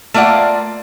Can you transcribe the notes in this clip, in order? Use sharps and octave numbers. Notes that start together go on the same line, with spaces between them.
A3 A#3 F4 D5 F#5